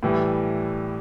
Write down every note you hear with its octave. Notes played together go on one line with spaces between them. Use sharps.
A2 E3 G3